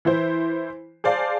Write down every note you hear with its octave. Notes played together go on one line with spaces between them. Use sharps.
E3 E4 C5
G#4 C5 D5 F5 A5